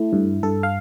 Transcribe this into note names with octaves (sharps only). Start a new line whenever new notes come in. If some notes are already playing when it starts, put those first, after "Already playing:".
Already playing: A3 E4
G2
G2 A4
F5